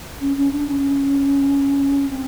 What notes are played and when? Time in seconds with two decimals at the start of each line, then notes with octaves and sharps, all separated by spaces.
0.20 C#4
0.37 C#4
0.52 D4
0.67 C#4
2.09 C4